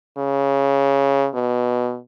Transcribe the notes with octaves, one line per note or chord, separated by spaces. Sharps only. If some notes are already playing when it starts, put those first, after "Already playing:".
C#3
B2